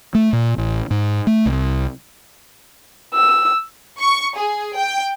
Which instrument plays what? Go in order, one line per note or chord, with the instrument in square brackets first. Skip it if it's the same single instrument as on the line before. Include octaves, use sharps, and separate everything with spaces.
[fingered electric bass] A3
A#2
A1
G#2
A3
C2
[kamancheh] E6
[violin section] C#6
G#4
G5